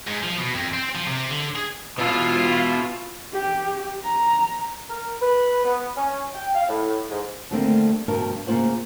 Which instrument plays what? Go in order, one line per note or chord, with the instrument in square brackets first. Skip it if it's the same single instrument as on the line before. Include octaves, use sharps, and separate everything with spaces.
[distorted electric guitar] G#2
F3
B2
F2
C4
F3
C3
D3
G#4
[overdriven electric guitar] B2 E4 [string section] F4
[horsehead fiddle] G4
A#5
[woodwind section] A#4
B4
B3
C#4
G5
F5
A2
G#2
[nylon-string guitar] D3 D#3 G3 A3 A#3 C4
D2 G2 B2 F3 A#4 A5
C#3 A#3 F4 C5 F#5